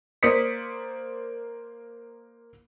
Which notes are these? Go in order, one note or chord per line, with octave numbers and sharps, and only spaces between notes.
A#3 C5 D5 D#6 B6 C#7